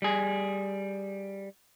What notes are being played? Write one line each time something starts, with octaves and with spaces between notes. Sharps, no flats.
G3 G#4